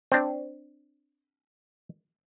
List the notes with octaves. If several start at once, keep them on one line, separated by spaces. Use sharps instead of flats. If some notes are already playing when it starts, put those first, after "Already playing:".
C4 D4